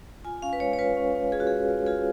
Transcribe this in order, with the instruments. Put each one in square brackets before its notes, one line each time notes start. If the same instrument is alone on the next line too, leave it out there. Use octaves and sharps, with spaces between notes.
[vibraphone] F4 G#5
C#4 F5
B4
G#3 C#5
C#5
F4 B4
C#4
C#4
F4 G#4
F#4
G#3 G#4
F4
F4 G#4